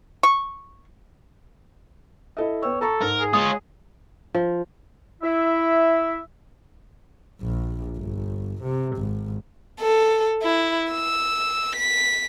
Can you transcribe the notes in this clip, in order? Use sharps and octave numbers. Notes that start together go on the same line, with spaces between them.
C#6
E4 A4 D#5
B3 C#5 G5 E6
A4 A5 A#5 C#6
G#2 A#4
G#4
G#3 F4 C#5 D#6
F3
E4 E5
A#1
G1
C3
G#1
A4
E4
E6
B6